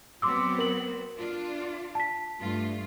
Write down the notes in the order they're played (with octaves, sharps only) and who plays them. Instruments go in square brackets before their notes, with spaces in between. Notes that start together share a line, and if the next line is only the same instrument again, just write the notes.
[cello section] F#3 B3 C4 [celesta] C6 D6 E6
[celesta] A#4 F#7
[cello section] D4 F4
[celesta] A5 B6
[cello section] G2 A3 F4